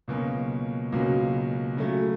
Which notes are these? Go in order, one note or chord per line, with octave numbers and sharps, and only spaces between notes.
C#2 B2 F#3 A#3 C#4
C#2 B2 F#3 A#3 C#4
C#3 F#3 A3